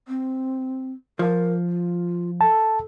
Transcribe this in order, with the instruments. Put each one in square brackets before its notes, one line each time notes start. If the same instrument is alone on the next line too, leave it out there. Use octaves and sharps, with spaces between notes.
[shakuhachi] C4
[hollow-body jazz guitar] F3 [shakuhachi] A#4
[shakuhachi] F4
[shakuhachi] A4 [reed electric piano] A5